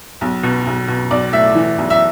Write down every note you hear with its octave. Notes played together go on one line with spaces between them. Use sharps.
B1
B2
B1
B2
B1 D5
A2 E5
E3
B1
E5